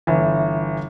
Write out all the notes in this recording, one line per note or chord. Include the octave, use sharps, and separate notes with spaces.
G1 E3